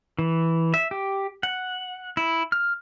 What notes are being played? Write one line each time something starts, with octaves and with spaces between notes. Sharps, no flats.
E3
E5
G4
F#5
E4
F6